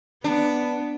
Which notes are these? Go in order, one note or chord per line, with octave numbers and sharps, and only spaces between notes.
B3 D4